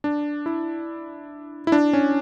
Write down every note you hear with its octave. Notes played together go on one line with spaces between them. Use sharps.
D4
E4
E4
D4
C#4